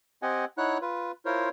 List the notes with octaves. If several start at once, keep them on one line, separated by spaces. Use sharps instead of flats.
C4 G4 D#5 F#5 G#5
D#4 E4 C#5 F#5 F#6
F4 B4
E4 F4 A#4 C5 C#5